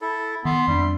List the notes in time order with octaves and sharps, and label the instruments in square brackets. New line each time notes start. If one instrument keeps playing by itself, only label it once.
[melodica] E4 A4
[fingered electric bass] D#3 [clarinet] B3 [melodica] E5 [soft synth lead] C6
[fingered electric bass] F2 D4 [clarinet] G3